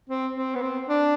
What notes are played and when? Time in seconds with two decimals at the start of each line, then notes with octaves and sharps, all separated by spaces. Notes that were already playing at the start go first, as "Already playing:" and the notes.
0.09 C4
0.36 C4
0.55 B3
0.62 C4
0.89 D4